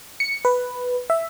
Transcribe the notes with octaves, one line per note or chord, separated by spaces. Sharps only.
C#7
B4
E5